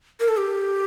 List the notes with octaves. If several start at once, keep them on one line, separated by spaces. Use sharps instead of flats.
A#4
A4
G4